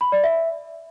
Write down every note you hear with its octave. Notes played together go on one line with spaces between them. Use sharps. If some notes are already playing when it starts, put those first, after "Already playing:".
B5
D5
E5